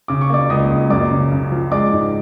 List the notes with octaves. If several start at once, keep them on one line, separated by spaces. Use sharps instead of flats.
C#3 D6
C#6
A#3 D5 D6
C#2 D#5 D#6
C#2
F#2 D5 D6
C#3
C#3
F3
G#3 D5 D6
G#2